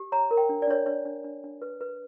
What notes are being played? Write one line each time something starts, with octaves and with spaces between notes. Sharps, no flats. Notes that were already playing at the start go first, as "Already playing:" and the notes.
Already playing: G4
C#5 A#5
A#4
G5
D4
D5
D4 C#5
D4 C#5
D4
D4
D4
B4
B4